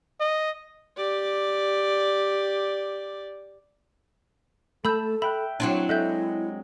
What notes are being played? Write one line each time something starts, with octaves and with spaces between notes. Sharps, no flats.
D#5
G4 D5
A3 A4 A5 B5 E6 G6
A4
E5 G5 B5 F#6
F#3 C4 D4 E4
G#3 A4 D#5 E5 F#6 G6